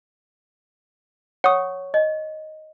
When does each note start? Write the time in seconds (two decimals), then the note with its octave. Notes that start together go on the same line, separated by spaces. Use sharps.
1.44 C#5 F#5 C#6 D#6
1.94 D#5